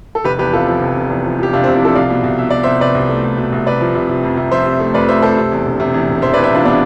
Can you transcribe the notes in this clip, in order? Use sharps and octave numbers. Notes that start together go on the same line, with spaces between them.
A4
F1 G4 B4
E2 G4 B4
C3 F4 A4
F3
F1
F1
E2
F3
F3 G4
C3 D4 F4
C4
C3
C4 E4
F3 F4 A4
C2 D5 F5
B2
C2
B2 E5
B2 D5
C2 C5 E5
C2 B4 D5
C2
A3
C2
B2
C2
C3 B4 D5
F3
C3
C3
F2
C3
F3 C5 E5
C3
A3
F2 B4 D5
A3 C5 E5
C3 A4 C5
C3
E2
E1
C3
E2
E1
E1 C5 E5
B4 D5
E2
C5 E5
E1 D4 F4
C3 B3 D4